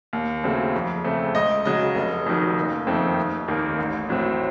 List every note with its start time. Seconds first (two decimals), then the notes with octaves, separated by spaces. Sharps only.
0.13 D#2
0.44 C#3 F#3 A3 C4
0.74 F2
1.04 C#3 A3 C4
1.35 C#2 D#5
1.65 C#3 F#3 D#5
1.95 F1
2.26 F2 D#3 F#3
2.57 F#1
2.87 F2 D#3 A3 C4
3.18 F1
3.48 D#2 D#3 A#3
3.78 A1
4.09 A2 F#3 C4